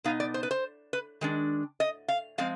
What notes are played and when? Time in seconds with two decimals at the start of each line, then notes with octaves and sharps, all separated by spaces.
0.04 B2 B3 D#4 F5
0.20 D5
0.34 C5
0.43 B4
0.51 C5
0.93 B4
1.21 D#3 G#3 D4
1.80 D#5
2.08 F5
2.38 F3 G#3 C4 F5